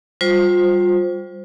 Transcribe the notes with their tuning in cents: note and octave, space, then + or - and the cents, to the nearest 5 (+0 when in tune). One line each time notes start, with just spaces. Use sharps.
G3 -5 F4 +30 C5 +0